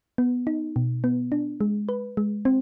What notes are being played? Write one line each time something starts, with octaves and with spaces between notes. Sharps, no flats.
B3
D#4
B2
B3
D4
G#3
B4
G#3
C4